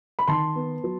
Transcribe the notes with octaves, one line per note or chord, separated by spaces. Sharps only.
B5
D#3 A5 C6
B3
F#3